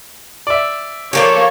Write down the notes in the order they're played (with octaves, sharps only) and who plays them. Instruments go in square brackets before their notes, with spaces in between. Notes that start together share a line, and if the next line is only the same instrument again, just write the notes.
[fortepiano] D5 E5
[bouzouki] F3 F#3 G4 [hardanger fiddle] A#3 A4 [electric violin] C#5